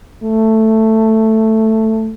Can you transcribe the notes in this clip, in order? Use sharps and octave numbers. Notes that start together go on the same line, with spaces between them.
A3